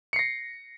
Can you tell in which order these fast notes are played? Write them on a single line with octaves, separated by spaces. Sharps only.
C#7 C7 A#6